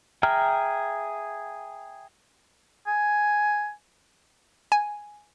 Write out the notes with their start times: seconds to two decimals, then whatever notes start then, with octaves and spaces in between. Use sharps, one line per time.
0.23 G#4 E5 G5 A#5 F6
2.87 G#5
4.72 G#5